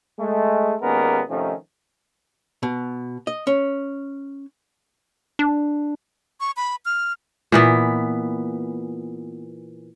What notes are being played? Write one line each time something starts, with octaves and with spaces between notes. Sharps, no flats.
G#3 A3
D#2 A#2 G#3 B3 C#4 A#4
C3 D#3 F3 A3 C#4 D#4
B2
D#5
C#4
D4
C#6
B5
F6
A#2 E3 B3